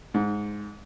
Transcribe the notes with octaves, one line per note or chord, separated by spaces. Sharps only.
G#2